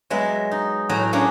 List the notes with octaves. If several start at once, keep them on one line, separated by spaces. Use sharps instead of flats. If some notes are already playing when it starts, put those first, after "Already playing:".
F#3 G#3 B3 E5
D#4
A2 F#3 G#4 A#5
A#3 C#4 D4 F#4 G#4